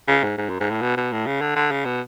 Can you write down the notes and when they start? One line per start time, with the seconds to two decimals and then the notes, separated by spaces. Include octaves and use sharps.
0.08 C#3
0.23 G#2
0.38 G#2
0.49 F#2
0.60 G#2
0.71 A2
0.81 B2
0.97 B2
1.12 A2
1.26 C#3
1.41 D3
1.56 D3
1.71 C#3
1.85 B2